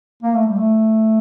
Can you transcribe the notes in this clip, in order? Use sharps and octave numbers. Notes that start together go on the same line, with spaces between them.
A#3
A3
G3
A3